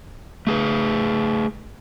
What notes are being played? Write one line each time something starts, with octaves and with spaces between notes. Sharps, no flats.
A3 G#4 B4